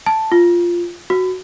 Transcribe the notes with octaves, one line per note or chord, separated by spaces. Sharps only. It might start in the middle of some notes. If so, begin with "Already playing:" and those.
A5
F4
F#4